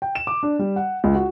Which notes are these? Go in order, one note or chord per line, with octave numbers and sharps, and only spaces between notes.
G5
E7
D6
D4
G3
F#5
C#2
F#4